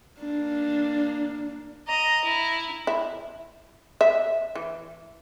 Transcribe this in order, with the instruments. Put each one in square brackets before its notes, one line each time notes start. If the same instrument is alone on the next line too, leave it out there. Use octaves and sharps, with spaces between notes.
[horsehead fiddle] A#3 D4
[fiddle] D#5 [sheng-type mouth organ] A#5
[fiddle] E4
[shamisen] E4
E5
E3